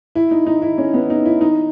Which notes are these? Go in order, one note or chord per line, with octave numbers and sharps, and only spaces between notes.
E4
D#4
D#4
E4
C#4
B3
D#4
E4
D#4